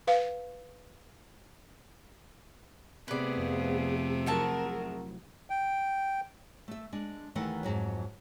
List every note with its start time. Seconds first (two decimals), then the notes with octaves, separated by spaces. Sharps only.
0.07 B4 F5
3.08 C3 A3 B3 G#4 B4 D5
3.37 F2
4.26 F#3 E4 F#4 G#4 A#4 E5 A5
5.50 G5
6.68 A3 E5
6.92 G#3 D4
7.35 D#2 D#3 E3 A3 F#5
7.63 F2 G#2 F#3